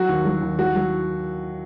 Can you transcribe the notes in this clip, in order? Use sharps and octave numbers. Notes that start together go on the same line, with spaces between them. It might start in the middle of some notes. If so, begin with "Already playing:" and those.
Already playing: F#3 F#4
D#2
F#3
D#2
F#3 F#4
F#3